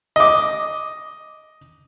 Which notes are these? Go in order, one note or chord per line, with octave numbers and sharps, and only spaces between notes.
D#5 D6